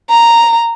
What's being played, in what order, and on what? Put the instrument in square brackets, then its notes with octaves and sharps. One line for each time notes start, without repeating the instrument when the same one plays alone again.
[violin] A#5